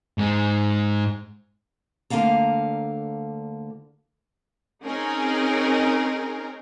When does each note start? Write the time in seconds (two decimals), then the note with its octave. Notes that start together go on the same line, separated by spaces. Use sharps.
0.18 G#2 G#3
2.10 D2 D3 A#3 F5 A#5
4.84 C4 C#4 D#4 G#4 A#4